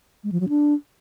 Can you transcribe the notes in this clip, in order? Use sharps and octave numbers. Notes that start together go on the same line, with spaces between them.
G#3
F3
F#3
D4